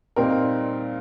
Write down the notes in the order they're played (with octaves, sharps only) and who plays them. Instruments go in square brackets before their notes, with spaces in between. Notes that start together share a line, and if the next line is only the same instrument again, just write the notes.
[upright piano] A#2 G3 C4 D#4 A#4